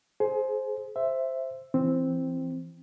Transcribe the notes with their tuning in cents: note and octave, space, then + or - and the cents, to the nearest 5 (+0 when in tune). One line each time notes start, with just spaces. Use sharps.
G#4 +30 C5 +0
C5 +0 E5 +5
E3 +20 C4 +0